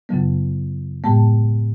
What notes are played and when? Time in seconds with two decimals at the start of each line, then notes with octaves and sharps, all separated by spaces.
0.09 F#2 C#3 F#3 B3
1.04 A2 G#3 B3